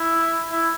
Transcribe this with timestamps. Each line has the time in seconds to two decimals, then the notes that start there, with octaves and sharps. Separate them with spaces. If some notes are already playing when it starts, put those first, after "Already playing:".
Already playing: E4
0.51 E4